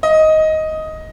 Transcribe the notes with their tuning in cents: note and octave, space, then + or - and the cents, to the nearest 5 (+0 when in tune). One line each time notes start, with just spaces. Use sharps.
D#5 +10